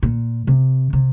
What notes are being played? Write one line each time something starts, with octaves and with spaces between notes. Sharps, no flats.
A#2
C3
C3